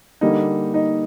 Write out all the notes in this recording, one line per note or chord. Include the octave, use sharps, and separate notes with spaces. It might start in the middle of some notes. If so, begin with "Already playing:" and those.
D3 G3 A#3 D#4
D#4